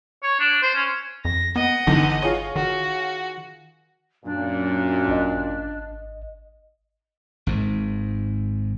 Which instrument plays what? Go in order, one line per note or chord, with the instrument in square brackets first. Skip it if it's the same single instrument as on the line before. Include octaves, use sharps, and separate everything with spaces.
[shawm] C#5
D4
C5
C#4
[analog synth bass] F2 [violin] A#6
[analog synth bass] B3 [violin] D#5 F#5
[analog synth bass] G1 [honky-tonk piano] E2 D3 D#3
[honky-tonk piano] F4 G#4 C#5
[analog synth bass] D#3 [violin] F#4
[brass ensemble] F#2 A#2 [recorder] D4
[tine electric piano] G#1 D#5
[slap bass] G#1 G#2